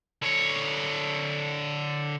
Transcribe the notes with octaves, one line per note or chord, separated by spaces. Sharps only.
D3 C#5